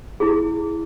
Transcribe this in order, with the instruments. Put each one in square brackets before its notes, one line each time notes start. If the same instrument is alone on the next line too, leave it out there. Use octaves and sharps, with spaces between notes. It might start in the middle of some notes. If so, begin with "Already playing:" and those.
[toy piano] E4 G#4